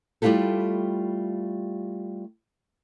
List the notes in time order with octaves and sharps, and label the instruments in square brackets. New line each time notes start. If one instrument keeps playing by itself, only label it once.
[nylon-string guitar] G3 A3 E4 F4 G4 A4